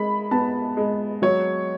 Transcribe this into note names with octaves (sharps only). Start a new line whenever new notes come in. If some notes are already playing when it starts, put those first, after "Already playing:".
Already playing: G#3 B5
B3 A5
G#3
F#3 C#5